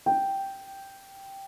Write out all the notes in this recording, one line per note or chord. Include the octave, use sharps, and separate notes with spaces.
G5